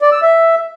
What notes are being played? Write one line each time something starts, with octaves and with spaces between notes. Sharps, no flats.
D5
E6
E5